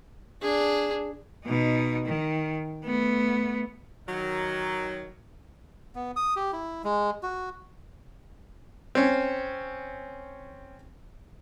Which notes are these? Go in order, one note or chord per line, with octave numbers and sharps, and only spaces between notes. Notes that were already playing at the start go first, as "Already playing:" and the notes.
D4 G#4
B2 D#4
D#3
A3 B3
D#3 F#3
B3
D#6
G4
E4
G#3
F#4
C4 C#4